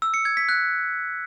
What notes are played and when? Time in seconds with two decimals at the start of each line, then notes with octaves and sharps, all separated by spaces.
0.02 E6
0.14 C#7
0.25 G#6
0.37 B6
0.49 F#6